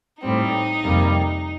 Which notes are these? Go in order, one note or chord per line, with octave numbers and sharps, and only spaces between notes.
A2 G3 C4 D#4
F2 C3 G3 A#3